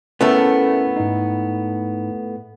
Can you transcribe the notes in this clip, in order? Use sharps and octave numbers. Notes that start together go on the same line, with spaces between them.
A2 A3 B3 C#4 A#4
G#2 D#4